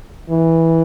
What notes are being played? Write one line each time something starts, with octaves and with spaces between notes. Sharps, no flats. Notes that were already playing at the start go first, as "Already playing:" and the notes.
E3